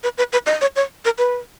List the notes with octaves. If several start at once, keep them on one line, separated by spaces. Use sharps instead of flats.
B4
B4
B4
D#5
C#5
C#5
A#4
B4